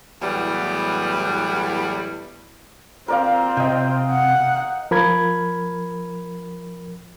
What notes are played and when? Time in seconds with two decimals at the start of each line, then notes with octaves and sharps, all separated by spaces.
0.21 E2 A2 F#3 G3 B3 E4
3.08 C4 F4 A#4 D5 F5
3.57 C3 D#5 G5
4.10 F#5
4.91 F3 A#4 B5 G#6